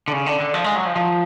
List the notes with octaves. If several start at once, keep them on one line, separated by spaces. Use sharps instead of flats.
D3
C#3
D3
D3
F3
G#3
F#3
F3
F3